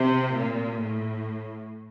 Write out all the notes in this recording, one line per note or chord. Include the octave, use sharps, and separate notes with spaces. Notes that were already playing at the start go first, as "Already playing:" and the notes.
Already playing: C3
A#2
A2